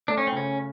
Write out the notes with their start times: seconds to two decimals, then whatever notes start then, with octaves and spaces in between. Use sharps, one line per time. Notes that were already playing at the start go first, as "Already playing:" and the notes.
0.08 A3 D4
0.18 C#4
0.27 C4
0.32 C#3 C#4